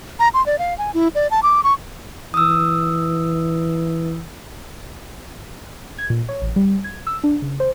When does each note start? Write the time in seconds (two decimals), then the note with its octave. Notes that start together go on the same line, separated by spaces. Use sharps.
0.19 A#5
0.34 C6
0.46 D5
0.59 F5
0.78 G#5
0.94 E4
1.15 D5
1.31 A5
1.43 D6
1.64 C#6
2.34 E3 D#6 E6
5.98 G#6
6.10 A#2
6.29 C#5
6.42 A1
6.56 G3
6.84 G#6
7.07 E6
7.24 D4
7.42 C#3
7.60 C5